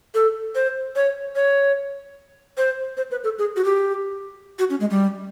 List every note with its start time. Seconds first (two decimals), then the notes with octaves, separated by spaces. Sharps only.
0.14 A4
0.55 C5
0.96 C#5
1.35 C#5
2.57 C5
2.97 C5
3.11 B4
3.24 A4
3.39 G#4
3.56 F#4
3.64 G4
4.59 F#4
4.70 C#4
4.80 G#3
4.90 G3